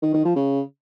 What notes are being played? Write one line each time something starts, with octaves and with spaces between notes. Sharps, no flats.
D#3
D#3
F3
C#3